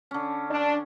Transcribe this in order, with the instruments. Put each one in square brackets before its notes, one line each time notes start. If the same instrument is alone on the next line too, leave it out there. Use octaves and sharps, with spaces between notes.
[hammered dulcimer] D3 C#4
[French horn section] D4